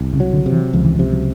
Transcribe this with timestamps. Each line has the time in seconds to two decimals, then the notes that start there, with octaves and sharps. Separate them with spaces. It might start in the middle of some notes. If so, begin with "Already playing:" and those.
Already playing: C2
0.13 C#3
0.20 F#3
0.33 D3
0.46 C3
0.52 E3
0.73 C#2 F3
0.85 E3
0.96 F3
0.99 C3
1.12 F#3